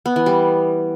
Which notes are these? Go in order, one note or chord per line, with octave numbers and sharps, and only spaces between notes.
B3
E3
G3